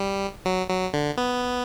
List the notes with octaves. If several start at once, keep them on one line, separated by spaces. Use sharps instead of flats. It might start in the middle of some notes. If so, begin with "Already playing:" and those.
Already playing: G3
F#3
F#3
D3
B3